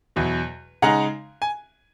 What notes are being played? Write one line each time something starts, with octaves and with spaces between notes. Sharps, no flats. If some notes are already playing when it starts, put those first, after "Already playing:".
E2 B2 F#3
C#3 G#3 D#4 F#5 A#5
G#5